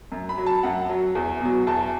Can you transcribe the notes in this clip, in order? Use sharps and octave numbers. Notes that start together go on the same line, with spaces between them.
F#2
B5
F#3
A5
F#2 F#5
F#3
E2
B2 F#3
E2 A5